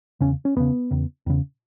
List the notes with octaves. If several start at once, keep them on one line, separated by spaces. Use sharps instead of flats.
E2 C#3 C#4
C#4
E2 C#3 B3
E2 C#3
E2 C#3